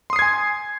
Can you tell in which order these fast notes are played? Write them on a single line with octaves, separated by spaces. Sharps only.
C6 D#6 C7 G#6 G#5